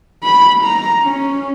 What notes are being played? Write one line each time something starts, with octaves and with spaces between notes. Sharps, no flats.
B5
A#5
C#4